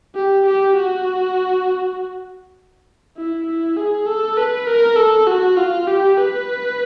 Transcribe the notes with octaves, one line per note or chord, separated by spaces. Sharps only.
G4
G4
F#4
E4
E4
G#4
A4
B4
A#4
A4
F#4
F4
G4
B4